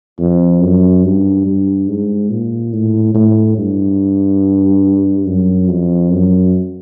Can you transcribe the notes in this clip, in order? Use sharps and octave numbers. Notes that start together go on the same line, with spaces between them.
F2
F#2
G2
G2
G#2
A#2
A2
A2
G2
F#2
F2
F#2